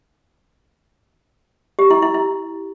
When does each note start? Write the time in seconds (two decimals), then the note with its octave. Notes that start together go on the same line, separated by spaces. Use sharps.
1.79 G4
1.91 E4
2.02 E4
2.14 E4